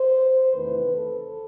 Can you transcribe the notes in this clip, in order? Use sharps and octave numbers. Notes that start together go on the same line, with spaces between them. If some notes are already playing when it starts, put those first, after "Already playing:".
Already playing: C5
E2 C3 D#3 A3 B4
A4